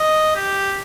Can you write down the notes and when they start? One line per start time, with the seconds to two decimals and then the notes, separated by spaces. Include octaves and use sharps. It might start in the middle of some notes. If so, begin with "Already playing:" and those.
Already playing: D#5
0.36 G4